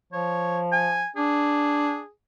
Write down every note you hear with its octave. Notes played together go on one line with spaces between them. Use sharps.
F3 C#5
G#5
D4 G#4